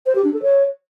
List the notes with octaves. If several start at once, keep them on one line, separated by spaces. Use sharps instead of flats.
C5
G4
D4
A4
C#5